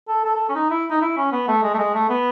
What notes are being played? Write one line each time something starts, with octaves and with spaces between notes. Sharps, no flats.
A4
A4
A4
C#4
D#4
E4
D#4
E4
C#4
B3
A3
G#3
A3
G#3
A3
B3